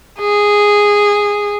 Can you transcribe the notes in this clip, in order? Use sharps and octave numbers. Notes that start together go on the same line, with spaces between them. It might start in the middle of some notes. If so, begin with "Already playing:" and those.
G#4